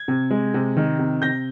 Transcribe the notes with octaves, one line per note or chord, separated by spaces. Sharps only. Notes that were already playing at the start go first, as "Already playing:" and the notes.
Already playing: G#6
C3
G#3
C3
D#3
C3
C3 G6 A#6